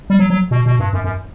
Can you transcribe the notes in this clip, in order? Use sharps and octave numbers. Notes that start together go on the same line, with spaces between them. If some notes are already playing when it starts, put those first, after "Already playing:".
G3
F#3
F#3
B2
B2
G2
F#2
F#2